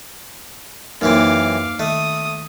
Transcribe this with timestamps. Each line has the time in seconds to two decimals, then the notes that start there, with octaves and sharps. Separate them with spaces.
1.01 F#2 E3 A#3 C4 D#4 A#4 F5 D6
1.79 D#3 A3 D#6